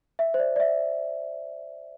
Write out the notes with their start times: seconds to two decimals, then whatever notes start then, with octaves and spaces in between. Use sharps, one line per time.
0.19 E5
0.34 C5
0.39 D5
0.56 D5
0.60 E5